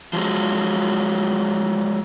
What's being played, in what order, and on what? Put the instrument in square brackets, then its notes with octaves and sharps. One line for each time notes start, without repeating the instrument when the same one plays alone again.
[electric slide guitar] F3 F#3 G#3